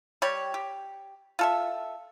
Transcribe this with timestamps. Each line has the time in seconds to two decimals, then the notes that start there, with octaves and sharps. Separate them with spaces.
0.22 G3 G4 C#5
0.54 G4
1.39 F4 A4 E5